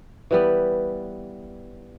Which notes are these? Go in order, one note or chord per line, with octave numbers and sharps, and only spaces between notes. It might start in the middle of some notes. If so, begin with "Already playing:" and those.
E3 G3 B3